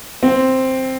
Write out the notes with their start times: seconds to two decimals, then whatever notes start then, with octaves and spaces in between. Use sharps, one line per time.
0.23 C4